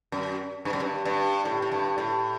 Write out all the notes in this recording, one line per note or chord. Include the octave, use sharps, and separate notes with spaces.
F#2
G2
F#2
G2
G2
A2
A2
G2
A2